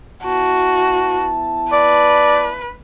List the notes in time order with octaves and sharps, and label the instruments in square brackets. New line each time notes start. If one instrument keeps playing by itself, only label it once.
[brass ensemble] B3 E4 A5 [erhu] F#4
[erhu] B4 [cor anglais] D5